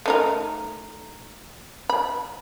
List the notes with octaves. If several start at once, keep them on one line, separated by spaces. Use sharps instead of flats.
A3 D#4 A#4
B5